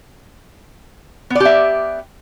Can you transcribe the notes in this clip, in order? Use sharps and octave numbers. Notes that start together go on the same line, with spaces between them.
B3 G4 D5 E5